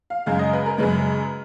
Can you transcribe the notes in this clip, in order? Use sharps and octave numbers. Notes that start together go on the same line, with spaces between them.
F5
F#2 C#3 G#3 F5
D#5
B4
A#4
F#2 C#3 G#3 B4